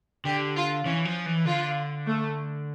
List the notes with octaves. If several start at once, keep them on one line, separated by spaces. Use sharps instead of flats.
D3 G4
F4
E3 C#4
F3
E3
D3 F4
A3